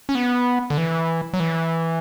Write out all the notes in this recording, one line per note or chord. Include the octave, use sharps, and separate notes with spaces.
C#4
B3
D3
E3
F#3
E3